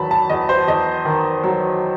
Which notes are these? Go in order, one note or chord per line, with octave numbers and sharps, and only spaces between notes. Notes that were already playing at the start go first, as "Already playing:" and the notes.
Already playing: E2 D#3 F#3 A5 B5
A5
E2 D#5
C5
E2 D#5
D#3
F#3